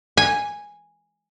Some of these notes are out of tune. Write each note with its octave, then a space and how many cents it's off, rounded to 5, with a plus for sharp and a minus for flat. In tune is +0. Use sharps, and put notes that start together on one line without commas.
G#5 -5